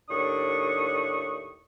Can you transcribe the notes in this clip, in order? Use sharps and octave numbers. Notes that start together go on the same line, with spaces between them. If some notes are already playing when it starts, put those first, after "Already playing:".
D#2 A2 D4 C#6 D#6